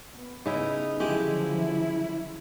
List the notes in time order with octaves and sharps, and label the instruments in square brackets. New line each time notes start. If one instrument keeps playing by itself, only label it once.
[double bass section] B3
[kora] C#3 E4 [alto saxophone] D#4
[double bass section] D3 F3 F#3 [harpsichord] G#3 [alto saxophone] E4 [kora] G4